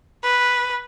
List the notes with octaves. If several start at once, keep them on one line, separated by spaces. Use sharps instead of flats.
B4